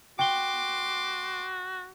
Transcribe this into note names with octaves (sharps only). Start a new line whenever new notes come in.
F#4 G5 C6 D6 G7